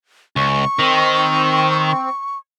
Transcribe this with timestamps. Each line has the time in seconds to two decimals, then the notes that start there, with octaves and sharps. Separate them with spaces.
0.36 C#2 C#6
0.79 D#3 C4